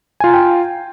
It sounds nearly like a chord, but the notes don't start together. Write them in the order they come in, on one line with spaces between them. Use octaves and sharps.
G#5 F4 A#5 F5 G5